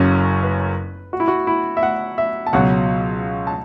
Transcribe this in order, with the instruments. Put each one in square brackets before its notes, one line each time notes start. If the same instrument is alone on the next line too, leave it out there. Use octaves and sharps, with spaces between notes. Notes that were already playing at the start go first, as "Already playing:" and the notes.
Already playing: [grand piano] F#1 F#2 F#3 C#4 [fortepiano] A4
[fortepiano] B4
F#4
E4
F#4
E4
E5
F#5
E5
A5
[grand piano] C#2 B2 F#3 [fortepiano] F#5
[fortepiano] A5